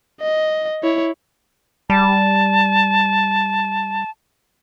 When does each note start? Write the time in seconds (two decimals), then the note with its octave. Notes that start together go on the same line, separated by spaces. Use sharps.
0.21 D#5
0.83 E4 C#5
1.90 G3 A5